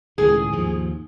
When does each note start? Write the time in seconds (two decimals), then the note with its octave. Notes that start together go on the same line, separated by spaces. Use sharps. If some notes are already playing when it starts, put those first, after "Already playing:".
0.18 C#2 A2 D#3 G#4
0.52 D#2 G#2 F3